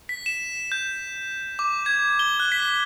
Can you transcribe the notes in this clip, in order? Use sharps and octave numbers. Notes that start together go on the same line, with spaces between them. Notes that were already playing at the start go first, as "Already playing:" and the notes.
B6
E7
G6
D6
G#6
G7
F#6
B6